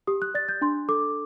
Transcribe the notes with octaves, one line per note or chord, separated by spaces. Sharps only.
G4 D#6
F#6
D5 A6
G6
D4 C6
A4 D6